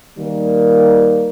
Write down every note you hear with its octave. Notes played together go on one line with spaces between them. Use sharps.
D#3 G3 A#3